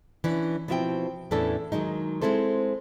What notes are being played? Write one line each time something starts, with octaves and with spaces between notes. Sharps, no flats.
E3 C#4 D4
B2 F3 C4 E4 E5 G5
E2 A2 E3 C#4 D4 A4
D#3 F#3 G#3 D#4
G#3 C4 E4 A4 C5